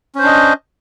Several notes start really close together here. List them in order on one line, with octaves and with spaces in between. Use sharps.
C#4 C5 D4 D#5